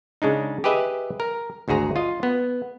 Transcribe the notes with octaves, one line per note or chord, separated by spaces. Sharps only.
C#3 G#3 D4 D#4
G4 G#4 B4 D#5 E5
A#4
G#1 D2 F#4 G#4 A#5
F4 D#5
B3